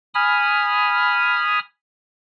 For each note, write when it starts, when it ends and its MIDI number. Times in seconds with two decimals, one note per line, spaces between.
0.14 1.59 80
0.14 1.59 83
0.14 1.59 87
0.14 1.59 89